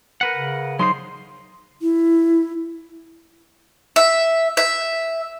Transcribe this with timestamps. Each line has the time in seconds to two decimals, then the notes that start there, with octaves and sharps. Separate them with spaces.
0.21 A#4 B4 F#5
0.36 C#3
0.79 F#3 D#4 C5 C6
1.82 E4
3.96 E5
4.57 E5